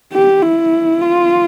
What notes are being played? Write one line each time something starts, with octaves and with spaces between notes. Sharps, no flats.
G4
E4
F4